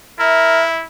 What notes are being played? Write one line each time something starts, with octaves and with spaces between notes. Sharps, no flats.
E4 A#4 E5